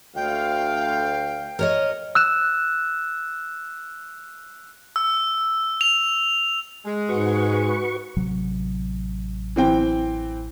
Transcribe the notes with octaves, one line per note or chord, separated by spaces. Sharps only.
D2 F5 G5
A#4 C#5 D#5
E6 F#6 E7
E6
F7
G#3
G#2 F#4 B4 C#6
A1 C3 F#3
E3 C4 G5